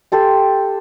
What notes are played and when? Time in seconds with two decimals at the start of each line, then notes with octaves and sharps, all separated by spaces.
0.12 G4 A4 C6